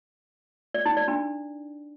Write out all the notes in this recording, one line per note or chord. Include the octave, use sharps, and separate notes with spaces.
D5
D#4
D5
D4